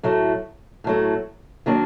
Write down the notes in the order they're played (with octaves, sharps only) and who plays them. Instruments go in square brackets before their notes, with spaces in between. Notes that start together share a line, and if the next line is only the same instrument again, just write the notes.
[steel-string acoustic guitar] A2 F#3 A3
A2 F#3 A3
D#3 F#3 A#3 D4